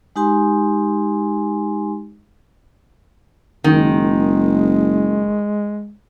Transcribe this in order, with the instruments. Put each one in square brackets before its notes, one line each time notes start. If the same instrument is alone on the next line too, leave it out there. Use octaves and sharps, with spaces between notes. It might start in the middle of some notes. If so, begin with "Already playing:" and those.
[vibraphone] G#3 D#4 G4 G#5 C6
[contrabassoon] F#1 [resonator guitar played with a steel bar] D#3 [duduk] G#3